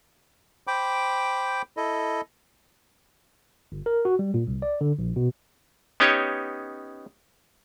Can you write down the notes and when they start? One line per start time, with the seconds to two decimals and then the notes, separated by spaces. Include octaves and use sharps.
0.67 C5 G5 B5 D6
1.77 E4 A4 D#5
3.72 G1
3.86 A#4
4.05 F#4
4.19 G3
4.34 A#2
4.47 C2
4.62 D5
4.81 D3
4.99 A#1
5.16 B2
6.00 B3 C#4 D#4 G4 C#5